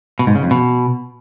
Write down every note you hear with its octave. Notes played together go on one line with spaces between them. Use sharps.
B2
G#2
C#3
F2
B2